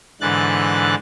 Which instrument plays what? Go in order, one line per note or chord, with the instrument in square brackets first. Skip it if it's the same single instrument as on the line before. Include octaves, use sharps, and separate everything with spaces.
[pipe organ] G#2 D3 E3 F#6 A6